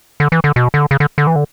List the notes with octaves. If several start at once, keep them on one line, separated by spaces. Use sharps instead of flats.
D3
E3
D3
B2
D3
C#3
D3
D3
E3
D3